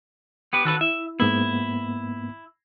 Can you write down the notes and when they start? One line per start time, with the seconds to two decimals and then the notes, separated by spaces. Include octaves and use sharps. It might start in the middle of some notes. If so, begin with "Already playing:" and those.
0.53 B3 G4 B4
0.65 D#3 F#4 A4 B4
0.81 E4 E5
1.20 G#2 A#3 B3 E4